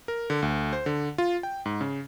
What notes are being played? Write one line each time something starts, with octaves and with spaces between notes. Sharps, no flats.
A#4
D3
D2
C5
D3
F4
G5
G#2
C#3